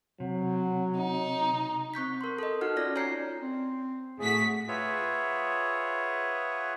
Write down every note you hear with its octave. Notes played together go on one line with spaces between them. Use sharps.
C3 F#3
D#4
C4 C#6 G6 B6
A#4 C6
A4 D#5
D#4 F#4 F#5 F6
C#4 F4 D5 A#6
C#5 G#5 A#5 G6 C7 C#7
C4
A2 F#4 G#4 B6
F4 G#4 B4 C#5 E5 F#5